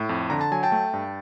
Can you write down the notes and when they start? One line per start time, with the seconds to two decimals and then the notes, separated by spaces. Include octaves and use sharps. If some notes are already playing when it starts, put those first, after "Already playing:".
Already playing: A2
0.09 F2
0.30 D3 A#5
0.41 A5
0.52 F#3 G#5
0.63 G5 A5
0.72 A3
0.93 G2